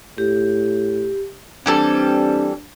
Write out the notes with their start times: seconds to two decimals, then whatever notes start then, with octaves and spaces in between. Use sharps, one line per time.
0.18 A2 G4
1.66 E3 G3 C4 D4 A4